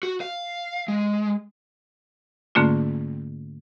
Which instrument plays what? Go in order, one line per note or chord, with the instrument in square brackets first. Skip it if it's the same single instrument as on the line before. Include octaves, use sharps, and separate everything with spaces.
[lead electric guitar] F#4
F5
G#3
[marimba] G#2 D3 A3 A#3 C#4 F4